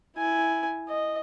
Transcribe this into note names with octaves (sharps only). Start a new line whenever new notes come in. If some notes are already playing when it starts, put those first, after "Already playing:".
E4 G#5
D#5